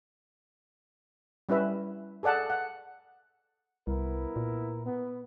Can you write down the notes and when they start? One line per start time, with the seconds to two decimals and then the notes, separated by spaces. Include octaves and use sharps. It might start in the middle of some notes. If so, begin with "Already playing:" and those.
1.49 G3 C#4 E4 B4 E5
2.23 G#4 A4 D5 F#5 A5
2.50 F#5
3.87 C2 B3 E4 A#4
4.36 A#2
4.85 B3